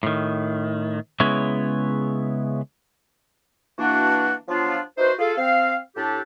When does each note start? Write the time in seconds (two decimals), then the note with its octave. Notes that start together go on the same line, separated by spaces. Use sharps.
0.03 A2 D#3
1.20 C#3 G#3 B3 E4 C#5
3.78 E3 A#3 D4 F#4
4.48 F3 F#3 B3 D4 F4
4.98 D#4 E4 F#4 B4 C5
5.19 F4 G#4 A4 F5
5.38 C4 F5
5.97 A2 D4 G4 A4